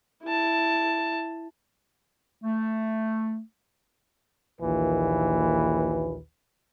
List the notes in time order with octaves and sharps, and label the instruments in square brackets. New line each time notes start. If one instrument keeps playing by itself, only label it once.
[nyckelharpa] E4 A5
[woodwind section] A3
[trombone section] A#1 D#2 A#2 E3 B4